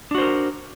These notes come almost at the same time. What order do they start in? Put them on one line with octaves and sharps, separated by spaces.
D4 F#4 C5 A#4